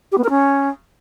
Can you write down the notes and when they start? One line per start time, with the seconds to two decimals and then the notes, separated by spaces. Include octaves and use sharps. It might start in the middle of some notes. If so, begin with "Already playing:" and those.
0.11 G4
0.17 B3
0.23 A#4
0.29 C#4